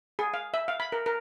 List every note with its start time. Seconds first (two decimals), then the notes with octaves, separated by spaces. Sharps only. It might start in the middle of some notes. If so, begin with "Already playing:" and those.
0.19 G#4
0.34 F5
0.54 E5
0.68 F5
0.80 B5
0.92 A#4
1.06 A#4